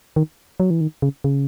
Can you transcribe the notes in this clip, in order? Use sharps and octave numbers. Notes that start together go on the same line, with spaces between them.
D#3
F#3
E3
D#3
C#3
C#3